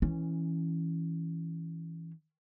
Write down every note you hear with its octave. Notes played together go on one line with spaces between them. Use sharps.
E3 C#4